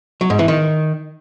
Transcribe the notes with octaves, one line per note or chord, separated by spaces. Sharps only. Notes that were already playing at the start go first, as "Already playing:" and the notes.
F#3
G#2
E3
D#3